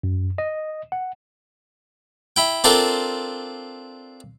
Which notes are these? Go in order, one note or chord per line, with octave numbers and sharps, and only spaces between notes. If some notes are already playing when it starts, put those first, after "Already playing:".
F#2
D#5
F#5
E4 G5
C4 D4 F4 A4 A#4 C5